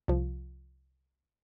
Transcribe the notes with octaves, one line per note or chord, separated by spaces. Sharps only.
C2 F3